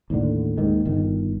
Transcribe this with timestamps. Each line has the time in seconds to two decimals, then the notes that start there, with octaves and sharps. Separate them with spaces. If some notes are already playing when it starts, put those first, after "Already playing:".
0.10 D#2 A2 D3
0.58 D#2 G#2 D#3
0.85 G1 D#3